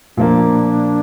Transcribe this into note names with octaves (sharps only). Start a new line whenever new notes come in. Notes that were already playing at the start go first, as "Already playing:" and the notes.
A#2 F3 A#3 D4